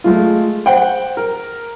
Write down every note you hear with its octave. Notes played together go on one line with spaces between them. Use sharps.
G#3 A3 F4
C5 F#5 G5
A#4